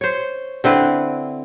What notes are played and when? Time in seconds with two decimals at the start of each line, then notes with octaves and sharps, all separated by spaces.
0.01 C5 C#5
0.64 D3 C4 E4 B4